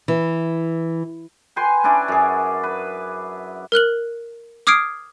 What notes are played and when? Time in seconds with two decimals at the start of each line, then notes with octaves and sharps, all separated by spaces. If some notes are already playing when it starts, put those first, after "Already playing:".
0.08 E3
1.56 B4 G5 G#5 C6
1.84 C#4 D4 E4 D5
2.08 F#2 G#4
2.63 B4
3.72 A#4 F6 F#6 F#7
4.67 D6 D#6 F6 G#6 C7 D7